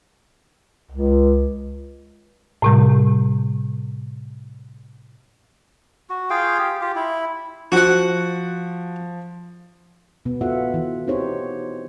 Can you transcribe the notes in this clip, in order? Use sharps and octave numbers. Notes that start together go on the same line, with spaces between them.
C#2
A2 C3 G3
F#4
F4 G#4 F5 G5
G4
F4 G4
E4
F3 F#4 F#5
B2 B3
B3 F4 F#4 A4 E5 F#5
E3
C4 D#4 G4 C5 C#5